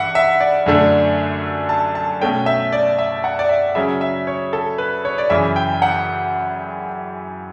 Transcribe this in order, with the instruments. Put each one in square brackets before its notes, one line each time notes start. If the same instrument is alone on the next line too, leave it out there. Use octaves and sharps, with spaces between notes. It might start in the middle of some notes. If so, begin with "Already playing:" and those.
Already playing: [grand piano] G2 E3 E5 F#5
E5
D5
F#2 D3 A3 D4
A5
A5
B2 A3 C#4 G5
E5
D5
E5
F#5
D5
E5
C#3 F#3 C#4 E5
E5
C#5
A4
B4
C#5
D5
F#2 C#3 E3 E5
G5
F#5